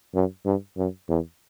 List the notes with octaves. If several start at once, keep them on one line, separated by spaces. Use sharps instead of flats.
F#2
G2
F#2
E2